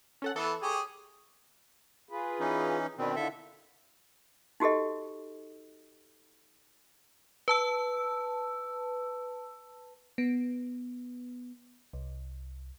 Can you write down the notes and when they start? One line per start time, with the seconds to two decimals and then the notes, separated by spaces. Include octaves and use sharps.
0.22 C#4 A4 F#5
0.36 E3 B3 E4 A4
0.62 G4 G#4 C#5
2.09 F4 G#4 B4
2.40 E3 C#4 D#4
2.98 B2 D#3 C4 D4 B4
3.16 D3 D#3 E4 F4 A4 E5
4.60 D#4 F#4 G4 A4 D#5
7.48 B4 A5 E6
10.18 B3
11.93 C2